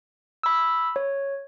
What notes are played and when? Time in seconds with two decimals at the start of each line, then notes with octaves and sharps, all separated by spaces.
0.43 B5 E6
0.96 C#5